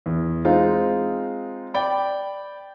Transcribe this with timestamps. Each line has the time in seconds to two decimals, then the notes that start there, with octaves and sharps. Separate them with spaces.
0.06 E2
0.45 G#3 C4 D#4 F4
1.74 D5 G5 B5